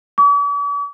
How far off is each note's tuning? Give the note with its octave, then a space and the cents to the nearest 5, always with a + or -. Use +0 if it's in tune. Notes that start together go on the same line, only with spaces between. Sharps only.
D6 -45